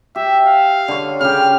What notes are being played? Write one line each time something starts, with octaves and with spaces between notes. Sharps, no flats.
G4 E5
F5
D3 C#5
C#3 G4 F6